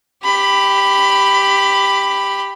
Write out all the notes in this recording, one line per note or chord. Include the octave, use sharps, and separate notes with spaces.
G4 B5